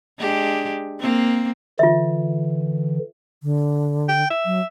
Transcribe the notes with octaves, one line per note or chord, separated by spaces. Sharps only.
G#3 D4 G4
A#3 C4
D3 E3 F4 E5
D3
G5
E5
F#3